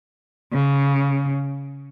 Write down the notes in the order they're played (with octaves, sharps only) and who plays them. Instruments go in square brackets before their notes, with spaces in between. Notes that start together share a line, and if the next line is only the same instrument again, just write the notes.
[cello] C#3